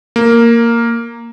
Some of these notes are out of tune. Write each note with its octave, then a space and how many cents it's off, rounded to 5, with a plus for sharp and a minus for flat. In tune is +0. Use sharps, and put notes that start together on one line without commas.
A#3 -5